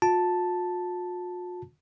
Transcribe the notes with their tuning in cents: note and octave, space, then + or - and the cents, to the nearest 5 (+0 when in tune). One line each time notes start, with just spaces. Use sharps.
F4 +45 A5 +0